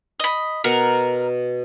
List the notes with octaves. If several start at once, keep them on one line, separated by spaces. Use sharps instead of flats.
D#5 B5
B2 A#4 F#5